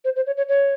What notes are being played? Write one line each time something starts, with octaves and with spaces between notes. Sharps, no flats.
C5
C5
C#5
C#5
C#5